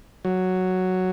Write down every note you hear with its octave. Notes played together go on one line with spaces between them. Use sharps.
F#3